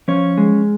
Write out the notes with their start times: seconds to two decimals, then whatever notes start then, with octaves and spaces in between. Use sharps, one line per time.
0.08 F3 C#4 C#5
0.38 G#3